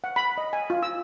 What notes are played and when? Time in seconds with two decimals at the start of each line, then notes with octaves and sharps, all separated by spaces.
0.04 F#5
0.16 B5
0.38 D#5
0.53 G#5
0.70 F4
0.83 E6